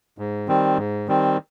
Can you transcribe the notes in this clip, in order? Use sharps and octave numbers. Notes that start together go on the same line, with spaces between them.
G#2
D#3 G3 C4
G#2
D#3 G3 C4